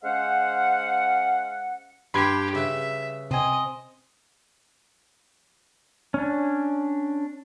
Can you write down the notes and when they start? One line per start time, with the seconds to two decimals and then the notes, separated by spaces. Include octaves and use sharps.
0.03 G#3 C#4 C5 F5 F#5
2.14 G2 G4 F5 B5 C6 G#6
2.55 C#3 B4 E5
3.31 C3 C4 D#5 G#5
6.14 C#4 D4